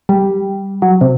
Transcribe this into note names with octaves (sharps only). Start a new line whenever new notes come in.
G3
F#3
C3